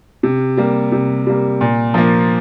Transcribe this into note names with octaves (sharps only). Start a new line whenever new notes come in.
C3
G3 A#3
C3
G3 A#3
A#2
F3 A#3